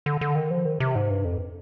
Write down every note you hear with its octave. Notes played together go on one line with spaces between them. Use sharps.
D3
D3
D#3
F3
D#3
C3
G#2
G2
F2